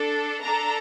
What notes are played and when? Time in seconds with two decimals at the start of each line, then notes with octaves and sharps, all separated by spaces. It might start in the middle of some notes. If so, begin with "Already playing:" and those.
Already playing: D4 A4
0.43 D4 A4 A#5